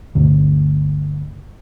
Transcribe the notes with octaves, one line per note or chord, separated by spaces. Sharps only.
G1 D2